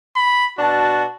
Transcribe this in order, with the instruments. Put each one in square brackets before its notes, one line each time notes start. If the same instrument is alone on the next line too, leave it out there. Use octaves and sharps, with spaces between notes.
[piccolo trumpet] B5
[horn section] B2 D4 A5 [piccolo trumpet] F#4